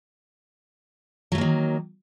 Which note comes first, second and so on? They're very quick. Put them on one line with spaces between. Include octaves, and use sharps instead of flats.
F#3 A3 A#3 D#3